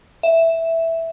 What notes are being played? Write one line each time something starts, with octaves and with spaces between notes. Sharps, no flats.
E5